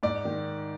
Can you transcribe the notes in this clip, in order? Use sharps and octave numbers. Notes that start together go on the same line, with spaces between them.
G#2 D5
D#3